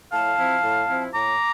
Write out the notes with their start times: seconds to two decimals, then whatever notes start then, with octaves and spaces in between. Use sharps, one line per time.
0.11 A2 F5 A5
0.37 F3 C4 E4
0.62 A2
0.88 F3 C4 E4
1.13 A2 A#5 D6